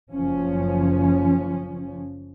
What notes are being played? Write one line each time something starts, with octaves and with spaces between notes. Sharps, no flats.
F#1 F3 C#4